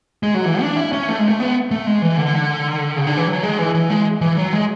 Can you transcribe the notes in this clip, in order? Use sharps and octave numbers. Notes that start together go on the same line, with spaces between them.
G#3
F#3
E3
D4
E4
C#4
A3
G#3
A3
B3
A3
G#3
E3
D3
C#3
D3
E3
F#3
G#3
E3
E3
G#3
E3
F#3
G#3